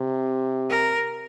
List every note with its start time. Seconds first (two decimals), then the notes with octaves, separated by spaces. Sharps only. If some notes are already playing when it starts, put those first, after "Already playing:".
Already playing: C3
0.70 A#4